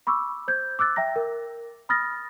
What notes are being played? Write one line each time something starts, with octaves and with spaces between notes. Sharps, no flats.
B5 C#6 D6 E6
C5 G6 G#6
D6 E6 F#6 A6
E5 G5 A#5 A#6
A#4
B5 D#6 F6 A6 A#6